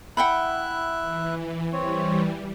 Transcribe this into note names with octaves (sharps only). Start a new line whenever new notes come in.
E4 E5 F#5 G5 B5 F#6
E3
E3 G3 C4 C#5